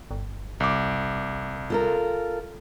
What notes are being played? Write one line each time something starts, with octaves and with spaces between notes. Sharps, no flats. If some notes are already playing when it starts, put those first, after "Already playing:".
G1
C2 D6
F4 A4 A#4